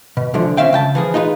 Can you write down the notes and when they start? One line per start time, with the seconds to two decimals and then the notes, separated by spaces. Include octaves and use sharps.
0.17 B2
0.34 C2 D3 E3 F3
0.57 C4 C#4 E5 F5 G5
0.73 C#3 G5 A5
0.95 E3 F3 G#4
1.14 D#4 F4 G#4 A4 B4